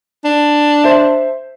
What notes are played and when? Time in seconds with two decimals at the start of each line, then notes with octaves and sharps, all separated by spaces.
0.25 D4
0.84 C5 E5